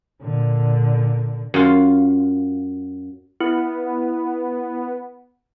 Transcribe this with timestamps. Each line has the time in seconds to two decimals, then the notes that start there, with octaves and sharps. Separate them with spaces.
0.22 A#2 D3
1.54 F#2 F4
3.40 B3 E4